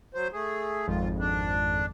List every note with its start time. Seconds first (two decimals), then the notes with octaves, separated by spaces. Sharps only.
0.14 F#3 C5
0.33 A3 G#4
0.88 G#1 F2 F4
1.19 D4